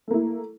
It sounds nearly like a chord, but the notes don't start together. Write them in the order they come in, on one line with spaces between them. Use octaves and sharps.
A3 A#3 E4